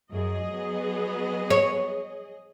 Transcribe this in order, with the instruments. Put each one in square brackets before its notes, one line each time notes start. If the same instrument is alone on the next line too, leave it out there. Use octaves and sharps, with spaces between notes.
[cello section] F#2 [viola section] G#4 D#5
[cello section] F#3 B3
[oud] C#5